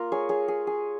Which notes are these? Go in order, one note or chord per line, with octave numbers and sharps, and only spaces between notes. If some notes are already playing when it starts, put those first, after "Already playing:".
Already playing: A#3 F4 A#4
G#4 C#5
G#4 C#5
G#4
G#4